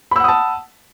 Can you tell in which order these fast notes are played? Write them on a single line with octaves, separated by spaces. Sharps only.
B5 E6 F#5 D#6 A5